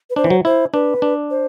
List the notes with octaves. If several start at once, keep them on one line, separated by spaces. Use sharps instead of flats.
B4
D4 C5
E3
F#3
E4 C5
D4 B4
D4
C5